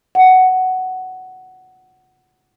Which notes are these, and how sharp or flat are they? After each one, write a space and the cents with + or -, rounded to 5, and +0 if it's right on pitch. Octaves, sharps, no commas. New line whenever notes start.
F#5 +10